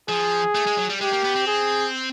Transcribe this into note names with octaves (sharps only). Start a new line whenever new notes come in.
F3 G#4
A3
G#3
F#3
G3
G#3 G4
A#3
B3
C4
G#4